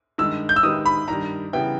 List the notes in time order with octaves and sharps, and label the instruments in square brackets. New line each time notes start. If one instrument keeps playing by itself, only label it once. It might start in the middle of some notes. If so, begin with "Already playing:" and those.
[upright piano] G2 D#3 G#3 [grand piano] E6
[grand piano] G6
E6
[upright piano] D#3 G#3 D#4 G4 B4 [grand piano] D#6
[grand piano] B5
[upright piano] G2 D#3 G3 [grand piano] A#5
[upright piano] C#3 E3 G3 B3 E4 [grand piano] G5